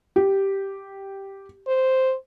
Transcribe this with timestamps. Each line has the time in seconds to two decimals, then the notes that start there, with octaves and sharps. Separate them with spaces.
0.16 G4
1.67 C5